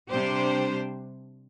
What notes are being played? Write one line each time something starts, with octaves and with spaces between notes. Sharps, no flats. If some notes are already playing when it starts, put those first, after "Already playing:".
C3 G3 D4 G4 C5